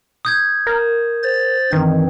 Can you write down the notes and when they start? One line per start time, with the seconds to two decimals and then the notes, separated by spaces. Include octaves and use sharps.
0.25 D#6 G6 G#6
0.67 A#4
1.23 C5 A6
1.73 G2 D#3 E3 C4